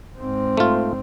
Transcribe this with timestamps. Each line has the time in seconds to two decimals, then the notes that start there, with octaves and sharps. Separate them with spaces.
0.18 G#2 C4
0.57 A3 F4